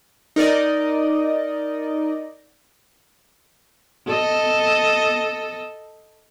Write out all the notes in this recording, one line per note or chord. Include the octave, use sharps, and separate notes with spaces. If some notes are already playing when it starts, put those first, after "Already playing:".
D#4 A#4 D5 D#5
A4 D#5